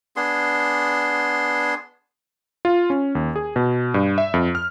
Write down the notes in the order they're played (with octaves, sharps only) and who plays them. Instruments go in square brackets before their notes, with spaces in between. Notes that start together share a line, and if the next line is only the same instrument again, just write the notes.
[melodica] B3 D4 G#4 C6
[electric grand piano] F4
C#4
D#2
G#4
B2
G2
E5
F2
F6